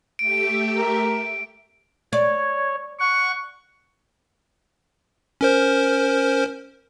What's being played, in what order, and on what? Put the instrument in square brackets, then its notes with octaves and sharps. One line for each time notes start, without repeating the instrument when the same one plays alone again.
[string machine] A3 G4 E5 [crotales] D7
[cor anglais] A#4
[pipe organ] C#5 [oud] D5
[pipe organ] F#5 [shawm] C#6
[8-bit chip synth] C#4 A#4 C5